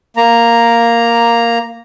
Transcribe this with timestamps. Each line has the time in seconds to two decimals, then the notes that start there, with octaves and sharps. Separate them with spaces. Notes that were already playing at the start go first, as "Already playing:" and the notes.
0.17 A#3 A#5